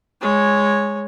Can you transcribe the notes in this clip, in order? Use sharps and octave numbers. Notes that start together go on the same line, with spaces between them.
G#3 C#5